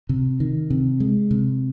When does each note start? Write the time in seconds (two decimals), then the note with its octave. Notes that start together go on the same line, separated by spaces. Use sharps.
0.09 C3
0.40 D#3
0.70 C3
1.00 G#3
1.31 C3